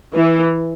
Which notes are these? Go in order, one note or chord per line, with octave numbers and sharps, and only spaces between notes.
E3